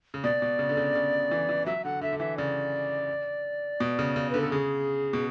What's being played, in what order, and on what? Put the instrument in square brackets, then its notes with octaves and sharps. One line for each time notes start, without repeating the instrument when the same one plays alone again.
[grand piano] C#3
[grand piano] B2 [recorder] D5
[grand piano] B2
C#3
D3
C#3
C#3
E3
E3
[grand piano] F#3 [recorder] E5
[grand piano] D3 [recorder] F#5
[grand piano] D3 [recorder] E5
[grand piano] D3
[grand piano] E3 [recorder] E5
[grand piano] C#3 [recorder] D5
[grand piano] B2
C#3
C#3
[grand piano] D3 [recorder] B4
[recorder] A4
[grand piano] C#3 [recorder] G#4
[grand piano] B2